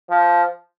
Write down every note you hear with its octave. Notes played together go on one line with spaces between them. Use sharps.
F3